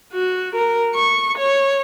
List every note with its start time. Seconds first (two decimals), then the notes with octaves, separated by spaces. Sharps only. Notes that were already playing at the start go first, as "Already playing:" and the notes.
0.13 F#4
0.55 A#4
0.95 C#6
1.38 C#5